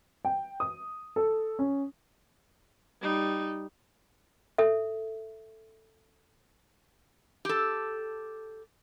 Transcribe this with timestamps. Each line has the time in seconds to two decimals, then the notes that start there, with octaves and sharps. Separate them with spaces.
0.25 G5
0.60 D#6
1.16 A4
1.59 C#4
3.01 G3 D#4
4.58 A4 E5
7.45 G4 A4